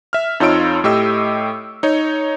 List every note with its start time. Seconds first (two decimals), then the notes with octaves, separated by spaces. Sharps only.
0.13 E5 F6
0.40 F2 D#4 F4 C#5 E6 D7
0.84 A2 G4 D#5 E6
1.83 D#4 C#5